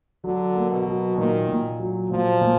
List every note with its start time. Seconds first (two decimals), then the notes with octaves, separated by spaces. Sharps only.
0.24 D3 F#3
0.55 A#3
0.70 B2
0.85 F#3
1.17 A#2 D#3
1.48 A#2
1.80 F#3
2.11 A#2 F3
2.41 A#2